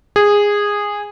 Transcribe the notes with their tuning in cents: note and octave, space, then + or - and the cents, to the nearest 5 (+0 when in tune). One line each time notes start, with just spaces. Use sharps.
G#4 -15